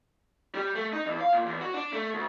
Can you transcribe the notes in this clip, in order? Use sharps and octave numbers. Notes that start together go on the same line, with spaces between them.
G3
A3
D#4
E2
F5
A#2
E2
F#4
D4
A3
D2